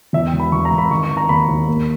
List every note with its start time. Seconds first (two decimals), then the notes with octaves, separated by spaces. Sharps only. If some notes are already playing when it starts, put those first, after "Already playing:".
0.13 E2 E5
0.27 G5
0.33 E1
0.40 B5
0.52 E2 C#6
0.65 A#5
0.72 E1
0.78 B5
0.91 D#3 C#6
1.03 C#6
1.10 D#3
1.17 A#5
1.29 D#2 B5
1.49 D#2
1.68 A#3